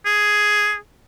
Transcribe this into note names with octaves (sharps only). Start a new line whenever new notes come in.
G#4